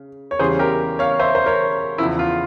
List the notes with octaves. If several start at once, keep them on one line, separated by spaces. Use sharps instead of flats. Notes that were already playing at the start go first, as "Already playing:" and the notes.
Already playing: C#3
C#5
E2 C#3 E3 G3 C#4 G#4 C5
G4 A#4
C#5 F5
C5 E5
C5
A#4 C#5
E2 C#3 F3 E4
F4